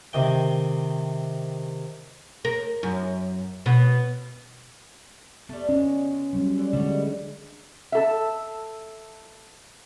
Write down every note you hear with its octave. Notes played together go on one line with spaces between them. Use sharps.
C3 D#3 G5
A#4
F#2
B2 B3
G3 A3 B3
G#3 C#4 D4
F#3 G3 C#4
D3
D3 G3 G#3 F#4
A4 E5